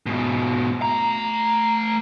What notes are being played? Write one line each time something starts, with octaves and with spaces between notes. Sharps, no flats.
G#2 B2
A3 A#5